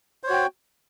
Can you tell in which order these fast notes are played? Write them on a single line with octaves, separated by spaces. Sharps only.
C5 C#5 F#4 G5